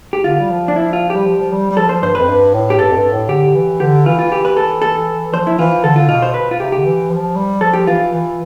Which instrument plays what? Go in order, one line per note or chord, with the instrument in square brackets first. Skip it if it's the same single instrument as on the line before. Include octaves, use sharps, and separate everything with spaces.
[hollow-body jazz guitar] G4
[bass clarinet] D3 [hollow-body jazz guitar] F4
[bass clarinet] G3
F3
[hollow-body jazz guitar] D4
E4
F4
G4
[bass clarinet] G3
F3
F3
G3
G3
[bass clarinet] F3 [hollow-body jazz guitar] A4
[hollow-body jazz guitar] C5
[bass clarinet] G2 [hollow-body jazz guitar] C5
[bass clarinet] F2 [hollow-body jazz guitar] B4
[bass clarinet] G2
A2
[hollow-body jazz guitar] G4
[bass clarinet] G2 [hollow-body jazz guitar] A4
[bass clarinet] F2
G2
A2
[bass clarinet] D3 [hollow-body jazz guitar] G4
[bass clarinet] E3
[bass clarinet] D3 [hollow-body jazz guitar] G4
[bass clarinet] E3 [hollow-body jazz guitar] F4
[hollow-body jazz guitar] F4
G4
B4
A4
A4
[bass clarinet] F3 [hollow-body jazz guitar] C5
[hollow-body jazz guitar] E4
[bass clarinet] E3 [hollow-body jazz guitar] F4
[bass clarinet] D3 [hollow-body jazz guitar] A4
[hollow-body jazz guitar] F4
[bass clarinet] B2 [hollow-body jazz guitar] F4
[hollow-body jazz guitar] C5
B4
F4
[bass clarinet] C3 [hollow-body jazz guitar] G4
[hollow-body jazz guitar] G4
[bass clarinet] D3
E3
F3
G3
[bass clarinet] F3 [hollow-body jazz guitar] A4
[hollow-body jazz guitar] G4
[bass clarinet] E3 [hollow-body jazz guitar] F4
[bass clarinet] E3